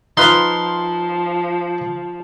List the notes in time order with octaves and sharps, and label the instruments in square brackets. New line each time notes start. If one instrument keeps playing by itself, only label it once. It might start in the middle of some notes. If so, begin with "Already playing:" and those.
[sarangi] F3 [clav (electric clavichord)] D#4 F4 B4 [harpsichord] C6